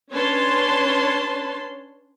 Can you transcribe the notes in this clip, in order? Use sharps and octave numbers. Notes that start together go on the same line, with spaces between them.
C#4 D4 B4 C#5 A5 C6